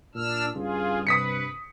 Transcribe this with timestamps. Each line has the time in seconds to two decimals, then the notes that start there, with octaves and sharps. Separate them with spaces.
0.15 A#2 D4 E6 F6
0.55 G2 C#3 F4 G#4
1.07 C3 B4 D#6 B6 C#7